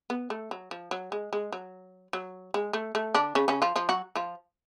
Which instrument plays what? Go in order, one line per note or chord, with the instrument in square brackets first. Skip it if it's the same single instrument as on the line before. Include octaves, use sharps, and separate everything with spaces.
[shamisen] B3
A3
F#3
F3
F#3
G#3
G#3
F#3
F#3
G#3
A3
A3
D3 D4
C#3 C#4
C#3 C#4
F3 F4
F3 F4
F#3 F#4
F3 F4